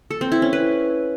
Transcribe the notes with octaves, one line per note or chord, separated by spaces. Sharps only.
A4
C4
E4
C#4
B4